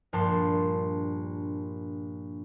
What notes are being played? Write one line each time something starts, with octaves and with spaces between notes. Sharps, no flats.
A#1 G2 D4 A5 C6